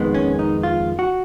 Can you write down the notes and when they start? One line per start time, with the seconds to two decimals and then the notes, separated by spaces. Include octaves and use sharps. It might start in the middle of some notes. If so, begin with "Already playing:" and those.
Already playing: F2 D#3 G#3 B3
0.14 C#4
0.39 D#4
0.63 F4
0.99 F#4